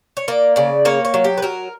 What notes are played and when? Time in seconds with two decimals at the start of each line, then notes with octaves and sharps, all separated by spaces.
0.17 C#5
0.28 A#3 D5
0.56 C#3 D5
0.85 A#3 C#5
1.05 C#5
1.14 F#3
1.24 G4
1.38 B4
1.42 F#3 A#4